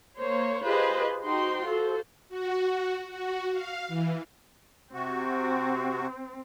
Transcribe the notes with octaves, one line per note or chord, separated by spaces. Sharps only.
A#3 C5 C#5
F4 G4 G#4 B4 C5 D#5
D#4 F#4 C5 G5 C6
F4 F#4 A4 C5
F#4
F#4
F5
E3
C3 C4 F#4